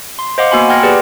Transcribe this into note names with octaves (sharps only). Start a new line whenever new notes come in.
C6
C5 D#5 F5 F#5 D6
A#3 B3 F#4 G#5 B5 C6
F#5 G5 C6 F6 G#6 A#6
G4 G#4 B4 D5